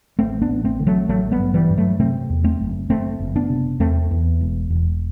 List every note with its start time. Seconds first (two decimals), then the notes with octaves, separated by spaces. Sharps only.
0.19 A1 A3 C4
0.42 B3 D4
0.49 A1
0.65 A3 C4
0.80 D3
0.87 F#3 A3
1.09 A1 F#3 A3
1.32 G3 B3
1.40 G2
1.54 E3 G3
1.70 G2
1.78 F#3 A3
2.00 C3 A3 C4
2.30 E2
2.44 A3 C4
2.60 F#1
2.90 F#1 A3 C4
3.20 F#1
3.36 B3 D4
3.50 C3
3.80 E2 A3 C4
4.11 E2
4.41 E1
4.70 E1